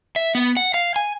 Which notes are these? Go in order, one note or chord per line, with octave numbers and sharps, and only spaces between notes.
E5
B3
F#5
F5
G#5